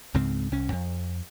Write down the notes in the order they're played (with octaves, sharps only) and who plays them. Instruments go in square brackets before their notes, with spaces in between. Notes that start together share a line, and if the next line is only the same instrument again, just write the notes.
[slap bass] C#2 G#2 C#3 C4
C2 C#4
F2